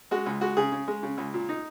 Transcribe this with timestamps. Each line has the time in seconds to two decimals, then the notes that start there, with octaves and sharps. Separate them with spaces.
0.11 G#3 F#4
0.26 C#2
0.41 G#3 F#4
0.57 C#3 G#4
0.72 C#3
0.88 G#3
1.03 C#3
1.18 C#2
1.34 A#2
1.49 D#4